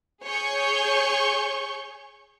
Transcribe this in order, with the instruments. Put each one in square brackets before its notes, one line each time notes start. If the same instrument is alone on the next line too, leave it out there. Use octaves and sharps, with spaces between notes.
[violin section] G#4 C#5 C#6 G6